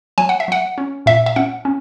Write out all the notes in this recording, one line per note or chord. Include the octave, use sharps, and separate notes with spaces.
F#3 G#5
F#5
E5
F#3 F#5
C#4
A#2 E5
E5
C#4 F#5
C#4